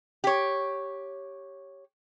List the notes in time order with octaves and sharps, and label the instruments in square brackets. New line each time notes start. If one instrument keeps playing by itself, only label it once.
[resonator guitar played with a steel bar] G4 C#5